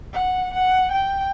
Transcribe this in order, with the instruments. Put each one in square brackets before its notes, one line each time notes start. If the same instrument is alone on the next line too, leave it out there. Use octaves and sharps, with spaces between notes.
[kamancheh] F#5
F#5
G5